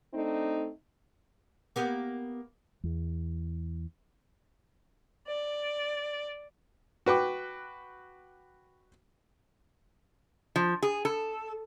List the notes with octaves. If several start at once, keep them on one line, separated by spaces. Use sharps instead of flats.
A3 C4 D4 D#4
A#3 B3 G4
E2
D5
F#4 B4 G5 D6
F3
G#4
A4